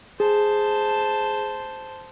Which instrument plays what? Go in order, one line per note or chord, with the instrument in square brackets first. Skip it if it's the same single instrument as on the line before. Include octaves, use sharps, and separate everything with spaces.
[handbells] G#4 [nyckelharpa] C5 A5